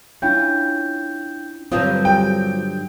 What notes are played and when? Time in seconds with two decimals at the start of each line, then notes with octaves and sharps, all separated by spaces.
0.22 C#4 D4 E4 F4 G5 G6
1.72 G2 D3 F#3 C4 F4 D#6 G6
2.05 G5